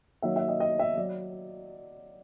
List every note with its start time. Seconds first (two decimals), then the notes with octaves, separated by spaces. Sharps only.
0.22 D#3 F#3 A#3 D#4 E5
0.36 E5
0.48 D#5
0.60 D#5
0.79 E5
0.97 F#3 D5